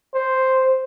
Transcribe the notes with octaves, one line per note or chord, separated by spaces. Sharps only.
C5